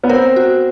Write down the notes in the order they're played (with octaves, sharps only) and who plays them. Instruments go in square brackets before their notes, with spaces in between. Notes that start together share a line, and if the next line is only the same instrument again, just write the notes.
[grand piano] B3
[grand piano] C4 [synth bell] A#4
[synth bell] F#4